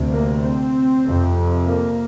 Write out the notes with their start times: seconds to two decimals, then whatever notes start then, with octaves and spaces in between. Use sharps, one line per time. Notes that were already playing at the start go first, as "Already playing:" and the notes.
Already playing: D2 C3
0.10 A#3
0.41 C4
1.05 F2 C3
1.67 A#3